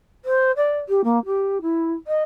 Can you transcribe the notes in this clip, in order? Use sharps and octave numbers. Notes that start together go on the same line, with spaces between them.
C5
D5
G4
A#3
G4
E4
D#5